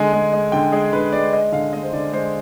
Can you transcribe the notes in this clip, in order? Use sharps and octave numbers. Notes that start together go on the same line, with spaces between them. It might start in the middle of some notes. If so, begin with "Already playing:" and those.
Already playing: D3 G#3 G#5
G#3
G#3
D3 G5
G#3 G#4
D3 B4
G#3 D5
G#3 D#5
D3 F5
G#3 D#5
C5
D3 D5
G#3 C5